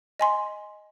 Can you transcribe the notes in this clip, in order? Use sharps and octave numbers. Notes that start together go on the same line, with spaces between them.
D#5 G#5 C6